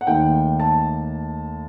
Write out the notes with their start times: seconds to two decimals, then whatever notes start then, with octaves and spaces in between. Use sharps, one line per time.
0.01 F#5
0.07 D#2 D#3 A3 G5
0.60 A5